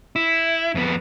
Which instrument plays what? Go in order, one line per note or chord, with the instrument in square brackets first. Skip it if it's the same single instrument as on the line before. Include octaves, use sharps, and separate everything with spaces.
[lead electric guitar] E4
F2 B3